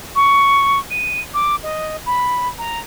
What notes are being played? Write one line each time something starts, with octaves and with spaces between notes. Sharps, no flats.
C#6
D#7
D6
D#5
B5
A#5